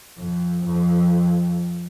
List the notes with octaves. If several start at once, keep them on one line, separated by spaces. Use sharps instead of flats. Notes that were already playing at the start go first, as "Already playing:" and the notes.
F2
F2